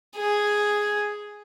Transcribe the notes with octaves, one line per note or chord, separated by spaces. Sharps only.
G#4